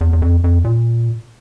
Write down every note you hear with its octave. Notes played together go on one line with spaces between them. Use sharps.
E2
E2
F2
F2
A#2